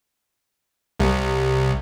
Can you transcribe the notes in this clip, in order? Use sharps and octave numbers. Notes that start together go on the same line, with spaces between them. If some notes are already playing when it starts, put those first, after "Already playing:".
C2